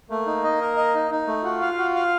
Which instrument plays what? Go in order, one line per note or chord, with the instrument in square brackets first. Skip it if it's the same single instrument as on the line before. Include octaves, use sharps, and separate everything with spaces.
[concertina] A3 [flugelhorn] A#3
[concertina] D#4
D#5
A#4
D#5
D#4
D#4
A3
[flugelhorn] F4 [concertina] F#4
[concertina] F5
F#4
F5